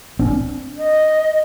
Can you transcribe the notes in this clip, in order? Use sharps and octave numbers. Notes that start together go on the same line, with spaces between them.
C4 D4
D#5